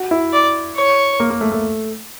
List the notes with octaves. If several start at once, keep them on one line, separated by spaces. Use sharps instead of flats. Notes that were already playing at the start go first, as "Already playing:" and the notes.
Already playing: F#4
E4
D5
C#5
A#3
A#3
A3
A3